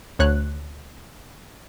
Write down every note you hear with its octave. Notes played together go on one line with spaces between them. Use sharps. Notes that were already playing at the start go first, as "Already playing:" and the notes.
D2 C#5 F#6